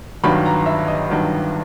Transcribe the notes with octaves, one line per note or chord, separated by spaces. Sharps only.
G1 G2 D#3 F#3 B5
A#5
E5
D#5
G1 G2 D#3 F#3